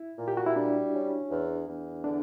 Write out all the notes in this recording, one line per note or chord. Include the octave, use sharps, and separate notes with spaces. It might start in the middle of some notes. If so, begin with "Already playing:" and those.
Already playing: E4
A#2
G4
F#4
E4
G3 D4
C#4
E2
E2
D3 D4